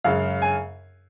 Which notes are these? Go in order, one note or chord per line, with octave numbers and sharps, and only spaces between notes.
F#2 C#3 G#3 F5
G#5